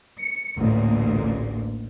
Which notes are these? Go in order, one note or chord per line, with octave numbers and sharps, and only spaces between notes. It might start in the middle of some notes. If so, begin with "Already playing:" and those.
C#7
A1 D2 A#2